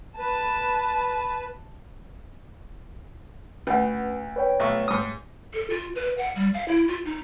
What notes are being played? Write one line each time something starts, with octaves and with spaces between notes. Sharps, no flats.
B4 A5
D2 C#4 B4 F#5
B4 C#5 G5
B1 A3 C#6
G#2 D#6
A4
F4
B4
F#5
G3
F5
E4
F4
D#4